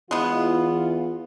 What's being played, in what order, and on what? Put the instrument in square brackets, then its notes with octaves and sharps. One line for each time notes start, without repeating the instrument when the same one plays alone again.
[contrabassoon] E2 [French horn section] E3 F4 [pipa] G#3 B3